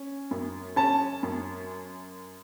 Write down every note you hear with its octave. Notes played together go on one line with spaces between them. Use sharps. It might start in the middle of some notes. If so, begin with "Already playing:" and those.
Already playing: C#4
F#2
C#4 A5
F#2